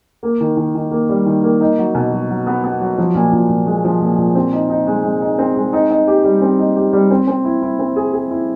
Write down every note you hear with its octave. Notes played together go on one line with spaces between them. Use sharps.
A#3
D#3
D#3
D#3
A#3
G3
D#3
A#3
D#4
F#3
B2
F#3
F#3
B3
B3
F#3
F3
A#2
A#2
A#2
G#3
F3
A#2
A#2
C4
D#4
D#4
G#3
G#3
D#4
C4
G#3
D#4
D#4
G4
G3
C4
D#4
G4
G3
C4
C4
E4
E4
C4
G#4
G#4
E4